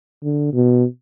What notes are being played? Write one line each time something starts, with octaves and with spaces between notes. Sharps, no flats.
D3
B2